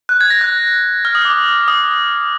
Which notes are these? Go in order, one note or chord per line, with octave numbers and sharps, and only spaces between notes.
F#6
G#6
A#6
F#6
F6
D#6
D6
D#6